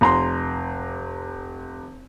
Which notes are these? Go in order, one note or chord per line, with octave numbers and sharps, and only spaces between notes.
F1 A#5 C6